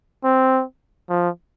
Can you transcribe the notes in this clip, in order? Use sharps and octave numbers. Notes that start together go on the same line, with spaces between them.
C4
F3